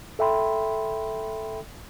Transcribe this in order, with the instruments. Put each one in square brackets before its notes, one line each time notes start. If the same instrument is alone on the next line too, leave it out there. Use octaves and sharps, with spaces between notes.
[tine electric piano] A4 E5 G5 B5 C6